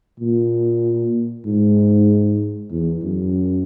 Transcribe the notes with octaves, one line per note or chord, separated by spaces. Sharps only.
A#2
G#2
E2
F#2